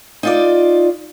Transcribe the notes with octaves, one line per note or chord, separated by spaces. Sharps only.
D#4 F4 D5